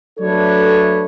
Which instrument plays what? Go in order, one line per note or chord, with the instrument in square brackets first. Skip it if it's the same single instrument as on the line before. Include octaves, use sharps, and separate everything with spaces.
[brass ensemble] F#3 A3 D4 A4 B4 C#5